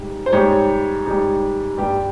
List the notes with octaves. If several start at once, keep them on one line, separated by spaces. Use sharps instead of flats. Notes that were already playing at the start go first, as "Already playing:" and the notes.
Already playing: G#2 G3
C5
G#2 G3 C#5
G#2 G3
G2 G3 G4